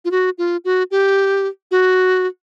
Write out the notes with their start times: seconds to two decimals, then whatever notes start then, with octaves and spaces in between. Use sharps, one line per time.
0.05 F4
0.11 F#4
0.38 F4
0.65 F#4
0.91 G4
1.71 F#4